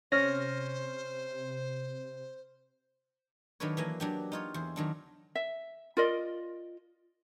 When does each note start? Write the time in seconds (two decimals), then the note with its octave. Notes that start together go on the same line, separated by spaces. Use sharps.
0.12 C3 C#4 C5 F6 A#6
3.60 D#3 F#3 D4 A4 B4 C#5
3.77 E3 F#3 A#3 G#5
4.00 F#3 D4 G4
4.32 D#4 F4 C#5
4.54 E2 C5
4.76 D#3 F#3 D4
5.35 E5
5.97 F4 A#4 D5 D#5